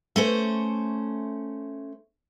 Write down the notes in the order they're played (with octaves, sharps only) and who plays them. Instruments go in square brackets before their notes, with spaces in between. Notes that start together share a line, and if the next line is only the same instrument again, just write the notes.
[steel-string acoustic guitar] A3 C#4 C5